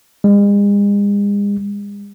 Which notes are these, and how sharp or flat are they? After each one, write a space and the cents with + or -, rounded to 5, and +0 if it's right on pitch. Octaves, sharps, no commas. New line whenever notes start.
G#3 -40